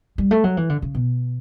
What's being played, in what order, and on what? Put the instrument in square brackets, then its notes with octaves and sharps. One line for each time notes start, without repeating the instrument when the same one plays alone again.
[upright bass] G3
A3
F#3
E3
D3
C#3
B2